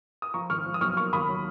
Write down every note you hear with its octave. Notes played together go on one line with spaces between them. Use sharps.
D#6
F3 A#5 C#6
G#1 C#6 F6
F3
D#6
B1 C#6 F6
A#3 C#6 F6
D#2 B5 D#6
F#3